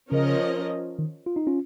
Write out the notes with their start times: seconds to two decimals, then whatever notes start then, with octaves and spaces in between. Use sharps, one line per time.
0.12 C#3 F3 C#4 A#4 D#5
0.99 D#3
1.26 F4
1.36 D#4
1.47 C#4 F4